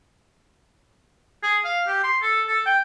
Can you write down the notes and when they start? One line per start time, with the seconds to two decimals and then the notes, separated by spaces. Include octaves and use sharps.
1.43 G#4
1.65 F5
1.87 G4
2.04 C6
2.22 A4
2.47 A4
2.66 G5